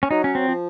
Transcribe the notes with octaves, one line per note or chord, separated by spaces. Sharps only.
C#4
F#3 D#4
C#4
C4
F3